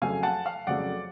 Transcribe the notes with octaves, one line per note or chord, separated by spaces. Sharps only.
F2 C#3 F#3 A3 F5 G#5
F#5 A5
F5
F2 C#3 F#3 A3 D5 F#5